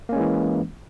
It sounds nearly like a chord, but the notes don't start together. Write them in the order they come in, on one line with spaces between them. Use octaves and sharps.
A#3 C#4 G#3 E3